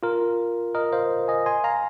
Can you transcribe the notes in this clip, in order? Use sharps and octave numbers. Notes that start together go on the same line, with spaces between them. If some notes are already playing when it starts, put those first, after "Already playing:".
F4 A#4
A#4 D#5
C5 F5
D#5 G#5
G#5 C6
F5 A#5